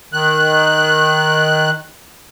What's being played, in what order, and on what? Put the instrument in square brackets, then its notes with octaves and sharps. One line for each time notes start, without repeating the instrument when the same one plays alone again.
[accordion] D#3 F#6